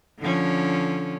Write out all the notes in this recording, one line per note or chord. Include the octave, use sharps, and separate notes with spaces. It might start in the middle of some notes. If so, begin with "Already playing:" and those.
D3 F3 C#4